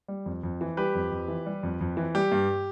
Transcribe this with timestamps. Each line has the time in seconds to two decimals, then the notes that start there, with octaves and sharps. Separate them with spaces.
0.08 G3
0.26 F2
0.43 F2
0.61 E3
0.77 G3 G4 B4
0.95 F2
1.12 F2
1.28 E3
1.46 G3
1.63 F2
1.81 F2
1.97 E3
2.15 G3 G4
2.32 G2